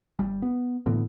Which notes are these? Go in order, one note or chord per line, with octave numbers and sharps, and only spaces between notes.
G1 G3
B3
A2 D3 E3 B3